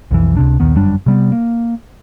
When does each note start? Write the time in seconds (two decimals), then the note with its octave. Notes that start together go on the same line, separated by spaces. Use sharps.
0.11 B1 F2 E3
0.37 C#2 C3 D4
0.60 A#1 D#2 D#3 B3
0.75 G1 F#2 G3 D4
1.06 C3 G3 B3
1.32 A#3